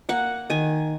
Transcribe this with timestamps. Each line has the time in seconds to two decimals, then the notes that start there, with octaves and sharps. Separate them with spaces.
0.09 A#3 F#5
0.50 D#3 G#5